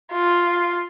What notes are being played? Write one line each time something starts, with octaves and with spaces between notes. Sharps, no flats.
F4